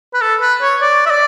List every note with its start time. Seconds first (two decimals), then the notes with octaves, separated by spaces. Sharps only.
0.14 B4
0.21 A4
0.41 B4
0.62 C#5
0.81 D5
1.06 E5
1.10 D5